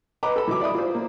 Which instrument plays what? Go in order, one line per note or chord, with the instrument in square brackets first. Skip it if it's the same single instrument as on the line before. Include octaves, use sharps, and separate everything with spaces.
[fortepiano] B4 D#5 A#5 B5 D6
A4 B5
E3 F#3 D6
D5 E5 B5 D#6
F4 C5
A#3